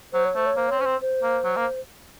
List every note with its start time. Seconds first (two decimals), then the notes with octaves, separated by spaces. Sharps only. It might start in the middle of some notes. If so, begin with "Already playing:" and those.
0.13 F#3 C5
0.25 C#5
0.35 A3 C5
0.46 C#5
0.57 A#3 C5
0.68 C4 C#5
0.79 C#4 C5
0.86 C4
1.01 C5
1.23 A#3
1.44 F#3
1.56 A#3